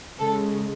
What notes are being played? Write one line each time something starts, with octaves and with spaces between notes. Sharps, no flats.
C#3 G#3 A4